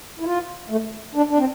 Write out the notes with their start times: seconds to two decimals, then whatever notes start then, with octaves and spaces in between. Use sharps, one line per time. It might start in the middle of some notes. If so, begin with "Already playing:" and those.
0.20 E4
0.25 F4
0.70 A3
1.15 D4
1.30 D4
1.38 C4